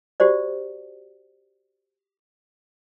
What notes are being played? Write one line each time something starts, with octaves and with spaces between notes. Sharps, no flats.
F#4 G4 C5 D5